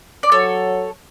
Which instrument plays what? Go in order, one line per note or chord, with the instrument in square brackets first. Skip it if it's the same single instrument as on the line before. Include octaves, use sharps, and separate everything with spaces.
[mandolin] D5
[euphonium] F#3 [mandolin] A4 C#5